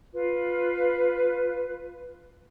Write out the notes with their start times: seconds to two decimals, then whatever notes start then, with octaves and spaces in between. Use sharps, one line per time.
0.13 F4 B4